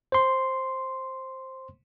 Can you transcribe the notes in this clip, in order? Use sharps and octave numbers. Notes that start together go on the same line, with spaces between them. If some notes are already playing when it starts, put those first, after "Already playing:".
C5 C6